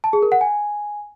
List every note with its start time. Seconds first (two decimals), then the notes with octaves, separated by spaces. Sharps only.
0.04 A5
0.13 G#4
0.22 A#4
0.32 F#5
0.41 G#5